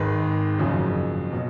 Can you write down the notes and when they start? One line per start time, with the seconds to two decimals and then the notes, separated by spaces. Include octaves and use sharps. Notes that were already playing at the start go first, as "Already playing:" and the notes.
Already playing: G#1 G#2 D#3 G#3 B4
0.58 F#1 F2 C#3 F#3
1.32 B2 F#3